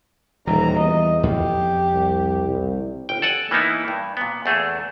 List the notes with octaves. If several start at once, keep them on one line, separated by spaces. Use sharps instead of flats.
D#1 E3 G3 A#5
E2 D#5
F2 G4
C2
C2
G1 G5
A4 D5 F#5 G#5
E3 A#3 B3 D#4 E4
G2
A#2 B3
E2 A3 G#4 A4